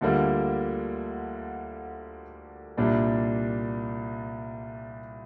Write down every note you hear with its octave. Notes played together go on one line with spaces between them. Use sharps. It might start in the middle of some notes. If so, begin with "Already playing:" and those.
D2 D3 G3 A#3 F4
C2 A#2 G3 D4